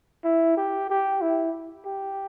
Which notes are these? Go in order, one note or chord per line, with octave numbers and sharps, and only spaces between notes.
E4
G4
G4
E4
G4